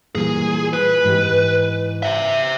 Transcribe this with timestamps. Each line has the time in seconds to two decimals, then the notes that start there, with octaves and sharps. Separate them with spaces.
0.15 A#2 E3 G3 G#4
0.73 B4
1.04 G#2 E3 G4
2.03 C5 E5